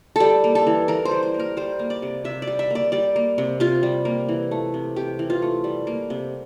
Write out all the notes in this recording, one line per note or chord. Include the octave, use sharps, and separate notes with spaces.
G3 G4 A4
A#3
A4
E3
E3 A#4
C5
G3
C5
A#3
A#4
G3 C5
A#3
D5
C3
C3 E5
D5
G3
E5
A#3 D5
G3 D5
A#3
C3
C3 F4
G3
A#3
E3
A3
C3
C3 G4
E3
F4
A3
G3
A#3
C3